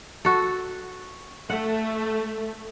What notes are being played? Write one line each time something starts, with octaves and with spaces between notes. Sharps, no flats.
F#4 A4
A3 F#5